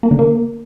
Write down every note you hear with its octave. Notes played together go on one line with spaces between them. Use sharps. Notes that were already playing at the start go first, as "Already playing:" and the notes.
A#3
D3
A#3